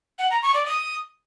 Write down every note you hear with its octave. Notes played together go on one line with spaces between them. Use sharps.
F#5
A#5
C#6
D5
D#6